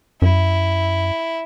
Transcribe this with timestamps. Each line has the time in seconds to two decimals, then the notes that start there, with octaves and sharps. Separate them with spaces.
0.22 F#2 E4